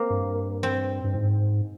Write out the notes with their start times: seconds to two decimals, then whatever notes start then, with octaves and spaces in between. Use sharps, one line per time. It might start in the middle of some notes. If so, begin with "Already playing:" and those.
Already playing: A#3 C4
0.10 G2
0.63 C4
1.04 G2
1.15 G#2